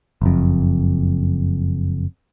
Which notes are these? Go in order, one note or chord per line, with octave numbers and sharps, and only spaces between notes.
F#1 F2